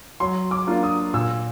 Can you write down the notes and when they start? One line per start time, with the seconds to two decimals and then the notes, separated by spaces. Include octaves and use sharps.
0.20 F#3 C6
0.51 D6
0.67 A#3 D4 F4
0.83 D#6
1.14 A#2 E6